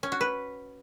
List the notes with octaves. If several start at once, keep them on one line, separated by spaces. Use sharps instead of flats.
C#4
F#4
B4